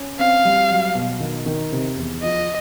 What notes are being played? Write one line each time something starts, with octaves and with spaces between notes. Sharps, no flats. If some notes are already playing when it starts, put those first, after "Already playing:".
Already playing: C#4
C4 F5
G3
F#3
B2
D#3
D#3
C3
E2
F3 D#5